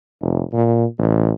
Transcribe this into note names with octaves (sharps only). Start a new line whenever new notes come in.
F1
A#2
A1